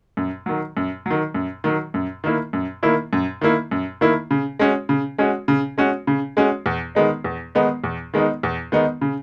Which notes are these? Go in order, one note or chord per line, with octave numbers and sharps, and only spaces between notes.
F#2
D#3 F#3
F#2
D#3 F#3
F#2
D#3 F#3
F#2
D#3 A#3 E4
F#2
D#3 A#3 E4
F#2
D#3 A#3 E4
F#2
D#3 A#3 E4
C#3
G#3 C#4 F#4
C#3
G#3 C#4 F#4
C#3
G#3 C#4 F#4
C#3
G#3 C#4 F#4
E2
D#3 G#3 B3 D#4
E2
D#3 G#3 B3 D#4
E2
D#3 G#3 B3 D#4
E2
D#3 G#3 B3 D#4
C#3